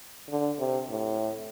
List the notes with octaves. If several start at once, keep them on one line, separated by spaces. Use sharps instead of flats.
D3
C3
A2